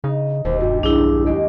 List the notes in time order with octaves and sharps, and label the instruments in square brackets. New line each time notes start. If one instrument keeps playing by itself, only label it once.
[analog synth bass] C#3 [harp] D#4
[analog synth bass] E1 [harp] D#2 [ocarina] C5
[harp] G2 G3 [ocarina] F#4
[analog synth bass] B1 [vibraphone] D4 E4 [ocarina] G#4
[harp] F#3 G#3 G4 [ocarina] D#5